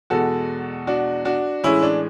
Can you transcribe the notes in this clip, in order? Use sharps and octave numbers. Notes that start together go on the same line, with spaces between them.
E2 B2 G#3 F#4 A4
D4 F#4
D4 F#4
A2 E3 G#3 C#4 E4
D4